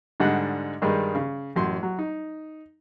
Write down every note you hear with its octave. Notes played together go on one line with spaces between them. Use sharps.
G#2 D3 G3 D#5 F#5 F#6
G2 D#3 G3 G#3 D#4
C#3
A1 F#2 C6
F#3
D#4